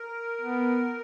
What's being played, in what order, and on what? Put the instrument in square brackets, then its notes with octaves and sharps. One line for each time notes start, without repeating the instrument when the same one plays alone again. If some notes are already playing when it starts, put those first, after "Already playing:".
Already playing: [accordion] A#4
[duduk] B3